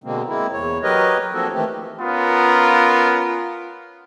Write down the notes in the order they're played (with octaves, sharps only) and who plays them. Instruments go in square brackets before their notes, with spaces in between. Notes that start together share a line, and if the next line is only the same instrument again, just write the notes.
[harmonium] B2 D3 G#3 A#3 C4
G#3 A#3 C4 E4
E2 C#5
F#3 G4 A#4 B4 C#5 D#5
F3 A#3 C4 D4 F#4 A4
D#3 E3 A3 C4 G4
[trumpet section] B3 C#4 F4 A#4